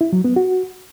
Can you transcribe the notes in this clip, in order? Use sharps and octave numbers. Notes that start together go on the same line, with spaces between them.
E4
F#3
B3
F#4